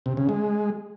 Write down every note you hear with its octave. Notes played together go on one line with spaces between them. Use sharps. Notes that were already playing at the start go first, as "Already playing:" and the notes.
C3
C#3
G#3